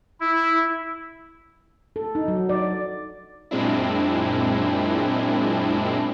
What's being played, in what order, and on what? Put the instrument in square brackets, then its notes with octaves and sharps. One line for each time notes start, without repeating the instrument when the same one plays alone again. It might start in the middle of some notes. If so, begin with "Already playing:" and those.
[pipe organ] E4
[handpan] A4
D#4
F#3
D5
[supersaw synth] F#2 A#2 G#3 C4 D4 E4